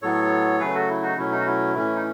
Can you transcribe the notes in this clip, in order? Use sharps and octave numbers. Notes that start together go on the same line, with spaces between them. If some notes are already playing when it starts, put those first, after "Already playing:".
A2 F#3 B3 A4 C#5
C#3 F#3 A3 G#4 B4
F#4 A4
E4
D#4 F#4
B2 F#3 A3 C#4 E4
D#4
F#4
E4
A2 E3 A3 C#4
D#4